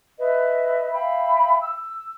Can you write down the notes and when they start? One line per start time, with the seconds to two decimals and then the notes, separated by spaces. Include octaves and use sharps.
0.19 B4 D#5 E5
0.91 E5 F5 G5 B5
1.60 E6